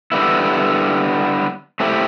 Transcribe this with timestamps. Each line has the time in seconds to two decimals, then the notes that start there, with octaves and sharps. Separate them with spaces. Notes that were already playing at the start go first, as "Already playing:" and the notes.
0.12 D3 G3 B3 E4
1.80 A3 C4 E4 G4